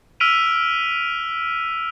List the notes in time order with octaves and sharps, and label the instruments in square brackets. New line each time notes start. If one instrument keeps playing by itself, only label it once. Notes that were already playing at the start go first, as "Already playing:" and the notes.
[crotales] E6 F6 B6 D7 D#7 F7